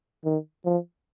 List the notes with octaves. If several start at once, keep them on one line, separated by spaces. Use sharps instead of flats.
D#3
F3